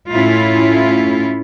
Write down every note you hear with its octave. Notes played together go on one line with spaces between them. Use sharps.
A2 C#4 E4 F4